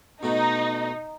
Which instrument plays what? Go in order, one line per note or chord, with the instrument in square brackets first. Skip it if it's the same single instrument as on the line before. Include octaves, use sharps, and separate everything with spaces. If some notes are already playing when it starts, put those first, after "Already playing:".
[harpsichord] B2 A3 B4 [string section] D#4